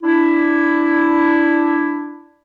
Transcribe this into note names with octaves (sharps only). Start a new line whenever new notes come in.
D4 E4